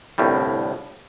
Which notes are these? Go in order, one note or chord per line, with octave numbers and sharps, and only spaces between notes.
G1 C2 A2 G3